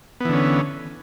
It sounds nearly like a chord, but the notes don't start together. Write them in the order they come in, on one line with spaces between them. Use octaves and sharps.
B3 E3 D3 C#4